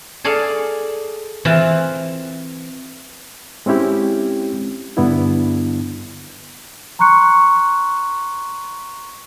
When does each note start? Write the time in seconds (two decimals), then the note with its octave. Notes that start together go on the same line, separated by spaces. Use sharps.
0.24 G#4 A4 D5 F5
1.45 E3 C4 F4
3.66 G#3 C4 C#4 E4 G4
4.97 G2 D3 B3 D4 E4
6.99 A#5 C6 C#6 F#6 C#7